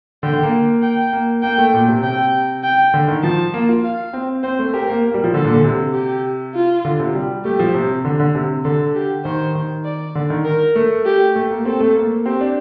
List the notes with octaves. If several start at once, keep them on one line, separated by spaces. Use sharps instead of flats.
D3 G5
D3
A#3
G5
A#3
A#3 G5
A3
A#2
C3
C3 G5
G5
D3
D#3
F3 A5
A#3
F4
F5
C4
C4 C5
A3
G4 A#4
A#3
A#3
G3
F3
D3 A4
A#2
D3
C3
G4
F4
D3
C3
G3
A3 G4
F3
C3
D3
D3
C3
D3 A4
G4
D#3 C5
D#3
D5
D3
D#3
A#4
A3
G4
A3
A#3
C4 A4
A3
A#3
C4 G4
D4